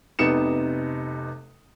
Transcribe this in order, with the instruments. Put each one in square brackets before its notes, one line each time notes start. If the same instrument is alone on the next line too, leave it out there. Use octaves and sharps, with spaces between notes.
[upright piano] F1 C3 B3 D#4 C#7 E7